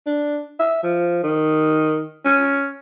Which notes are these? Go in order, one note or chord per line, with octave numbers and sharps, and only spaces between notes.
D4
E5
F3
D#3
C#4